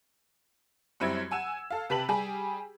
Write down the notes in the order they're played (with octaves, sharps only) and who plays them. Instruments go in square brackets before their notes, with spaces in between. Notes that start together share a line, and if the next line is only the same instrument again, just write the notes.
[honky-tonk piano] F#2 G3 C4 E4 G#6
F#5 G#5 E6 E7
A4 F5
C3 G4 B4 A5 B6 F#7
G3 G4 G#4